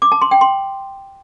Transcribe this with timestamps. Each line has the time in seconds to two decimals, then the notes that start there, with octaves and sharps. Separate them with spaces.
0.02 D6
0.12 A5
0.22 C6
0.31 G5
0.41 C6